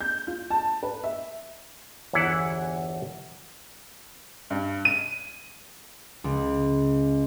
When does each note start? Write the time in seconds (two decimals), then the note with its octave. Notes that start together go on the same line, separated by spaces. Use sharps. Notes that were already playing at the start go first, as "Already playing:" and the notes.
0.01 G6
0.27 F4
0.50 A5
0.83 B4
1.04 E5
2.13 G1 E2 E3 E4 F#5
4.50 G2
4.85 D#7
6.24 C#2